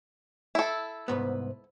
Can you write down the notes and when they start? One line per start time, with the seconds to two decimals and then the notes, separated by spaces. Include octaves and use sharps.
0.55 E4 A4
1.08 C2 G#2 B3